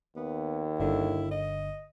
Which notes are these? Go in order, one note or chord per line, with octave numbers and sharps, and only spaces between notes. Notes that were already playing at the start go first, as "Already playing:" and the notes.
D#2 B3
G1 D3 E4
D#5